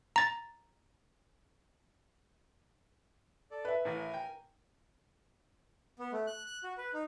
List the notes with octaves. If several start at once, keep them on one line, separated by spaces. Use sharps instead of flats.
A#5 A6
A4 D5
B4 E5
A1 A2 A#4 G#5
G5
B3
A3
F#6
F#6
F#4
B4
D#4